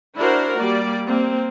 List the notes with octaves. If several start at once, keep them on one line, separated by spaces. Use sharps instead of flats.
D4 E4 F#4 A#4 C5
G3 A#3 D5
A#3 C4